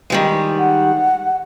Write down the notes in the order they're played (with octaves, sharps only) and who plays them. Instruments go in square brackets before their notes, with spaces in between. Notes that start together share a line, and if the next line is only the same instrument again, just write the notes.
[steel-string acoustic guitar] D#3 G3 G#3
[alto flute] F#5